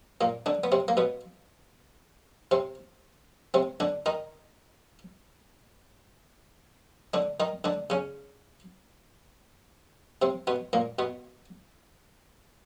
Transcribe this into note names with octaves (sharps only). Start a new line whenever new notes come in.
A#2 A#3
D3 D4
B3
C3 C4
A#3
B2 B3
C3 C4
C3 C4
D3 D4
D#3 D#4
D3 D4
D#3 D#4
D3 D4
C#3 C#4
C3 C4
B2 B3
A#2 A#3
B2 B3